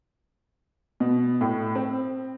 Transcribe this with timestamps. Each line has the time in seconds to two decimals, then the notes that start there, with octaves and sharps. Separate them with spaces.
1.00 B2
1.41 A2
1.75 C4